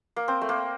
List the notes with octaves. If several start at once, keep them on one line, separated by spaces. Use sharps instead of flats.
A#3
C4
A3
A#3